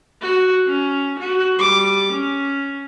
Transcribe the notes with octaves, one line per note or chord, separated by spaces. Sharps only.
F#4
C#4
F#4
G3 D6
C#4